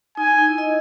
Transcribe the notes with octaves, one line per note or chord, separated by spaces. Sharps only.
D#4 G#5
D#4
D#4
E4
D#5